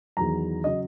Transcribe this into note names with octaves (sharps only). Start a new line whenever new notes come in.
E2 D#3 F#3 A#5
C#3 F#3 D#5